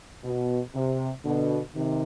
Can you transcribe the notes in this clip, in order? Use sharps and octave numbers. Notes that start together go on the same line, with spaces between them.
B2
C3
B2 D3
C3 D#3